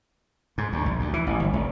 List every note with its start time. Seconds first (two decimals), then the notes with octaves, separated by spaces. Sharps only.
0.58 G#2
0.73 D2
0.86 A#1
1.00 D2
1.13 E3
1.27 A1
1.40 G1
1.53 G#1